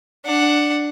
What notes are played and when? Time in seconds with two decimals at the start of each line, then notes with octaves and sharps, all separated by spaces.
0.25 D4 F#5